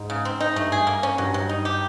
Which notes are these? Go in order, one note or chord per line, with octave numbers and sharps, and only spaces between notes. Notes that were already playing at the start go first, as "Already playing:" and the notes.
Already playing: G#2
C#3
C4
D#4
G2 A3
G#4
A#3
C#4
G2 F#3
F#3
D#4
G4